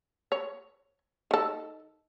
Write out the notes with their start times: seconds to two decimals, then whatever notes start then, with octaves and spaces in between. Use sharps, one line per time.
0.32 C#5
1.31 D#3 A4